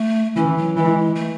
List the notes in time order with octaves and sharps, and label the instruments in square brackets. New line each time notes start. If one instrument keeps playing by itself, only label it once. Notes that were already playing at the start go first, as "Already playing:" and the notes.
Already playing: [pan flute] A3
[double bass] E3 [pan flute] C#4
[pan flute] F#3
[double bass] E3 [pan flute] G#3
[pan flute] A3